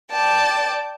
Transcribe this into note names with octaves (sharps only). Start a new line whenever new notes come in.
D5 G5 A5